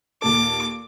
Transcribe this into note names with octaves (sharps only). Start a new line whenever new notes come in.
D#2 A#2 A4 D6